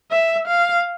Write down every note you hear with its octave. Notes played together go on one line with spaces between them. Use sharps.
E5
F5